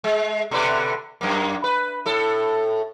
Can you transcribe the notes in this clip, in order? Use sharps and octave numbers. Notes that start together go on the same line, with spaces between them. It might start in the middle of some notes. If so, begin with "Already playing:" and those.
G#3
B2 D3 B4
F#2 A#3
B4
A2 A4